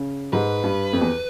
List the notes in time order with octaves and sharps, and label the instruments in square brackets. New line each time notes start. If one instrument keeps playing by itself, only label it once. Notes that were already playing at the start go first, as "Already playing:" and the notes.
Already playing: [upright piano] C#3
[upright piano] G#2 [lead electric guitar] B4
[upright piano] G2
F2
E2